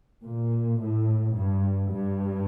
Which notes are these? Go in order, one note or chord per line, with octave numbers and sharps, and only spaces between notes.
A#2
A2
G2
G2